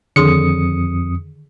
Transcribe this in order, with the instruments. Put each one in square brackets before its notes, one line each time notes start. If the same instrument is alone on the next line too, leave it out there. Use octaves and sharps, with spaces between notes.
[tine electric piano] F2 D#6 C#7 [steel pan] D3 [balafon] D#3 G#4 C6